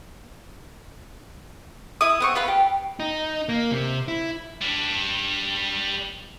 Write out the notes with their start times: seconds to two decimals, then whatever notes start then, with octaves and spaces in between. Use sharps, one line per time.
2.01 E4 D#6
2.20 B3 C4 C#6
2.35 B3 F4 B4
2.48 G4
3.00 D#4
3.49 A#3
3.72 C3
4.08 E4
4.62 G3 D4